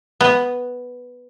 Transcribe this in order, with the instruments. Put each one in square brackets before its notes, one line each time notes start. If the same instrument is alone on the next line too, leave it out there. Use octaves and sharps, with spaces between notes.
[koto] B3